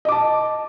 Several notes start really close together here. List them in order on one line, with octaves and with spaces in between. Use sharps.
D#5 D6 A5